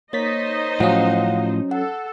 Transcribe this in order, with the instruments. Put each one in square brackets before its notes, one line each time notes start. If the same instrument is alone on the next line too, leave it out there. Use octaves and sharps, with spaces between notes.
[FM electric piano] A#3 A6 B6 [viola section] D#4 C5 D#5 [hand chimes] C#5
[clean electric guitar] A2 F3 [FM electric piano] F#3 C#4 [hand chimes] F5 F#5
[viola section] A4 [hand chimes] F#5